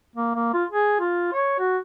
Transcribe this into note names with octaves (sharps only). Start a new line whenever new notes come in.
A#3
A#3
F4
G#4
F4
C#5
F#4